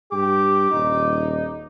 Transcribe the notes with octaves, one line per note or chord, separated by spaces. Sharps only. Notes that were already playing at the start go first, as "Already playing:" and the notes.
G2 G4 D6
D#1 D#4